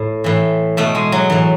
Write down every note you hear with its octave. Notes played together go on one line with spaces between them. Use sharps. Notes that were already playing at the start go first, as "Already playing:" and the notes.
Already playing: A2
A2 E3
B2 A3
G#3
F#3
A2 E3